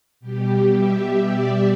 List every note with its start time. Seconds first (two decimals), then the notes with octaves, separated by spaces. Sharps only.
0.20 B2 G3 G4
0.67 E5
1.14 D5